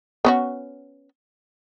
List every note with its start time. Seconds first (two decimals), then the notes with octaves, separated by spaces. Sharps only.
0.25 B3 C#4 F#4